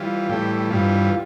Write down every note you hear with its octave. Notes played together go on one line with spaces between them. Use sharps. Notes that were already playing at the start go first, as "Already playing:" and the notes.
Already playing: E3 G3 F4
A2 E3 G3 G4
G2 E3 G3 F4